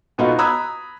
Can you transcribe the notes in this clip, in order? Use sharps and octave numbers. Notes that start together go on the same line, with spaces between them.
B2 B3 D#4 F4 F#4
A#5 B5 D#6 E6 F#6 G#6